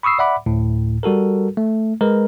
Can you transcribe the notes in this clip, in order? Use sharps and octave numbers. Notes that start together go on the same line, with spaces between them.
B5 C#6 D#6 E6 C7
D5 E5 F#5 B5 D6
D2 A2
G3 F#4 A4 A#4
A3
G#3 A#4 B4